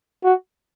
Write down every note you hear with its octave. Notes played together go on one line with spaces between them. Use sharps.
F#4